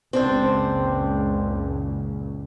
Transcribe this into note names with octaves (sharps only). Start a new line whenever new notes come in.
F#1 C#2 A#2 C4 D4 C5